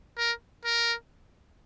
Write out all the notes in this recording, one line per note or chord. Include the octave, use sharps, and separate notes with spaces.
A#4
A#4